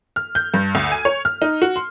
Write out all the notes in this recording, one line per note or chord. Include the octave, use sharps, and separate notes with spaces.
F6
G6
G2
D2
G#5
C#5
F6
D#4
F#4
C6